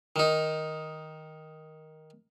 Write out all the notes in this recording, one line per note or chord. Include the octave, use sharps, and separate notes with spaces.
D#3 D#4